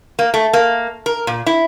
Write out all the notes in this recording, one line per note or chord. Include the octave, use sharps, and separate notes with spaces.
A#3
A3
A#3
A#4
A#2
E4